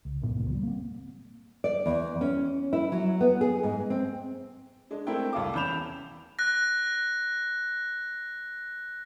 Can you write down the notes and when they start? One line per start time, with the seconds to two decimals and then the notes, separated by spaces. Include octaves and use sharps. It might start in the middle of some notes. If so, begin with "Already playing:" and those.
0.05 C#2
0.22 C#2 G2 A#2 B3
0.37 F#1 C#2 A#2
0.50 F#3 G3
0.63 A#3 C4
1.64 D5
1.86 E2
2.21 C#4
2.73 E4
2.92 F#3
3.21 B3
3.41 G#4
3.63 G#2
3.90 C4
4.91 G#3 D4
5.07 A3 C4 E4 A#4 G5
5.33 C2 E4 F5 A5 D6
5.54 E2 C#4 B5 G6 E7 F7
6.39 F#6 A#6